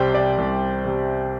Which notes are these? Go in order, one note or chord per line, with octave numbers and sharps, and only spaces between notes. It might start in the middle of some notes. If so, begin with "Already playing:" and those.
Already playing: C2 C3 G3 G4 C5 D5 G5
D5
C2
C3 G3